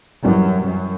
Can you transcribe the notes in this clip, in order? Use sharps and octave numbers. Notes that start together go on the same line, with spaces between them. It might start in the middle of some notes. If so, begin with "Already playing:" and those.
F#2 E3 G3 C#4
F#2